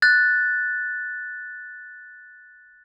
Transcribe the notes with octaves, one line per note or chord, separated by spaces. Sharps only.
F#6 A6